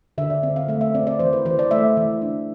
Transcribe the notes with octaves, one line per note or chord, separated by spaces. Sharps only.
D3 E5
D5
C4 E5
F5
A3 E5
E5
C4 D5
D5
E3 C5
B4
E3 C5
D5
A3 E5
E3
D4